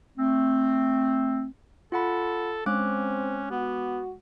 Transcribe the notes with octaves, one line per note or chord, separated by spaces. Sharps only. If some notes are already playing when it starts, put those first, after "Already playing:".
A3 C4
F4 A4 F#5 B5
G#3 C4 C#4 D6 F#6
B3 F#4